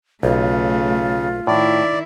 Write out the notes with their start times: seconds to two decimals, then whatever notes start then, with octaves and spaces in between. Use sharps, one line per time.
0.23 B1 C#3 A3 F4
1.47 A2 D#3 E4 D5